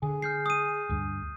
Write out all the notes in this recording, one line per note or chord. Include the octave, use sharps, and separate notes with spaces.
D3 G#4
F6 G6 C7
D#6 D#7
D2 G2